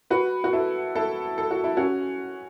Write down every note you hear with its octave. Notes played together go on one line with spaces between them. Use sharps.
F#4 B4
F#4
E4 A4
E4 A4
A4
F#4
E4
C#4 F#4